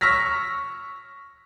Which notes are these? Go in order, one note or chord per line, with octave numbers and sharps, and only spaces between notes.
C#6 E6 F6 A#6 B6